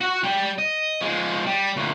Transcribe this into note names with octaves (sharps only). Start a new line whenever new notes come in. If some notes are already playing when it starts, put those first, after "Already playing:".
F#4 F#5
G3 G5
D#5
F3 G#3
G3
D2 A#2